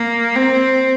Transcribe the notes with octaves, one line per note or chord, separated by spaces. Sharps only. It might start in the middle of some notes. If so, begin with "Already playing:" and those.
Already playing: A#3
C4